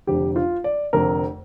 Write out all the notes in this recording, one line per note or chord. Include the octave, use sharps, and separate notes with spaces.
F1 F2 D3 G4
F4
D5
F1 F2 D3 A#4